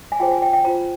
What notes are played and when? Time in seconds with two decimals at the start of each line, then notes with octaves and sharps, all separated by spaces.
0.12 G#5
0.20 F4 G#4 C5 G5
0.32 G#5
0.42 G5
0.53 G5
0.64 F4 C5 A#5